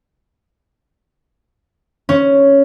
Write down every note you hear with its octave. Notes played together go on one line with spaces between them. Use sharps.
C#4